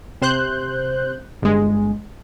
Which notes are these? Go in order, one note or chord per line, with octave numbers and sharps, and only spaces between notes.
C3 C5 F#6 G6
G1 G#3